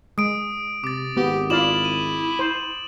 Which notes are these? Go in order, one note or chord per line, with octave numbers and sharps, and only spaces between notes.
G#3 D#6 D7
C3 D6 A6
G#1 B3 G4
E4 F4 D5 F5 E7 F#7
D#7
C5